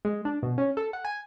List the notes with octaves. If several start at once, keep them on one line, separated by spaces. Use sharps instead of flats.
G#3
D4
B2
C#4
A4
F#5
G#5